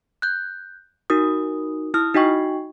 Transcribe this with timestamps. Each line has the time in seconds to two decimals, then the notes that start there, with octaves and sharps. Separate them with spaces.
0.22 F#6 G6
1.10 D#4 F#4 A#4 D#6
1.94 E4 D#6 F6
2.14 D#4 F#4 D#5 G5 C#6